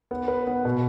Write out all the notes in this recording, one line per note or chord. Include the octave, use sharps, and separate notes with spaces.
B3
B4
B3
B2